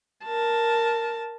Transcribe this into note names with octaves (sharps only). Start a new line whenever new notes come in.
A#4 A5